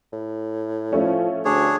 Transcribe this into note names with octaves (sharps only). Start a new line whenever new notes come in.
A2
F3 A3 C#4
D2 D4 G#4 C#5